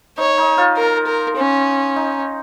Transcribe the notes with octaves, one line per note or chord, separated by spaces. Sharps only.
D#4 C#5
D#4
F4
A#4
A#4
C#4
D#4